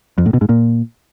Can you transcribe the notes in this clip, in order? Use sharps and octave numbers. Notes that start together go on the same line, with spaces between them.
F2
A2
B2
G#2
A#2